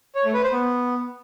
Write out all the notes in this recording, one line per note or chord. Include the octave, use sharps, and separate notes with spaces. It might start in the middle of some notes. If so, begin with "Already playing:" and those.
C#5
A3
B4
C5
B3